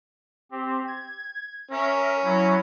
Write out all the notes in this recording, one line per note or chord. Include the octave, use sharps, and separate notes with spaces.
C4 G4
G#6
C#4 A#4 E5
F#3 E4 F#4